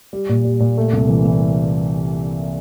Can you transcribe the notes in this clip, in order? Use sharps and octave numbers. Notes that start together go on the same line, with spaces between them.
G3
A#2
G3
A#2
A3
C2
E3
E3